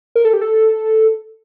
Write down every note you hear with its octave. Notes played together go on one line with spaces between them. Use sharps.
A#4
A4
G4
A4